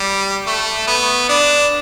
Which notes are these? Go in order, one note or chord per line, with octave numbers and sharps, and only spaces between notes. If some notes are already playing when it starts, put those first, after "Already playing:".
Already playing: G3
A3
B3
D4